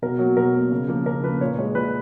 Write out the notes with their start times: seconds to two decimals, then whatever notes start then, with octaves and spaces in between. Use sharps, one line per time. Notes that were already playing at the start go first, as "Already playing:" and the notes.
0.02 B2 A#4
0.19 F#3 A#3
0.37 B2 A#4
0.54 F#3 A#3
0.72 C#3
0.88 F3 A#3
1.06 C#3 A#4
1.23 F3 A#3 B4
1.41 A#2 C#5
1.58 G#3 C#5
1.75 A#2 B4